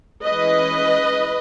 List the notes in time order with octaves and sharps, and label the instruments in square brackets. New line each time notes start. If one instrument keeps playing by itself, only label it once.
[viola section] E3 G#3 C#4 B4 D#5